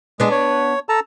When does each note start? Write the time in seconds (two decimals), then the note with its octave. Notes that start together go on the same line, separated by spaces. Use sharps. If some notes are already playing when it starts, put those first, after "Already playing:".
0.20 G#3 B3 D4
0.31 C#5
0.89 A4 A5 A#5